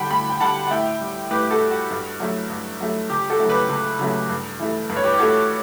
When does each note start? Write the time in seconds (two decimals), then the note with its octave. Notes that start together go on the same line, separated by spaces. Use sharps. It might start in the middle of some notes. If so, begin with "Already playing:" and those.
Already playing: D3 G3 F#5 G5 A5 B5
0.11 D2 G5 B5
0.29 G5
0.41 D3 G3 F#5 A5
0.67 F#5
0.70 A2 E5 G5
1.00 G3
1.31 A2 G4 B4
1.50 F#4 A4
1.60 G3
1.70 F#4
1.91 G2
2.20 F#3 A3
2.50 G2
2.80 F#3 A3
3.10 C#2 G4
3.30 F#4 A4
3.40 C#3 F#3 A3
3.50 G4 B4
3.69 C#2
3.99 C#3 F#3 A3
4.29 G2
4.59 E3 A3
4.90 G2 B4
4.97 C#5
5.04 G4 B4
5.14 G4
5.19 E3 A3 F#4 A4